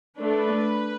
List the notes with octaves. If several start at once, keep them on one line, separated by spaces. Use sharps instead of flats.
A3 D4 B4